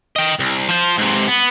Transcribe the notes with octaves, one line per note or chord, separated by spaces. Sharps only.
D#5 G5
C2
F3 C5
G#2 C3
B3